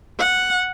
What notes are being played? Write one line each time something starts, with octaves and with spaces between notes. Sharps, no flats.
F#5